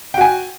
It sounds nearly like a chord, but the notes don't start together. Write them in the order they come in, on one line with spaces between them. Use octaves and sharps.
G5 F#4 G#5